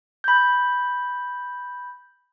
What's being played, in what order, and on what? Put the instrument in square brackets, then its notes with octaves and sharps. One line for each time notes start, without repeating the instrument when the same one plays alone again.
[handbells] B5 G6